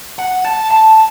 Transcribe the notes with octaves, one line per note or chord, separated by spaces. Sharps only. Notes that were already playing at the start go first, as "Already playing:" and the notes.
F#5
A5
A5